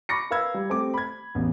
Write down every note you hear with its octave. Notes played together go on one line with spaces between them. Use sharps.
B5 C#6 D6 A#6 C#7
A#4 B4 F5 B5 E6 G#6
G3
A3 C4 G4 A4 D6
B5 G#6
A1 E2